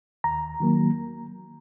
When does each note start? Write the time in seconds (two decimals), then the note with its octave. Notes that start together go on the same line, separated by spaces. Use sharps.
0.24 D#2 A#5
0.60 D#3 F#3 A#3